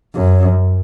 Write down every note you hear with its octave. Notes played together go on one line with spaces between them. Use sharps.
F#2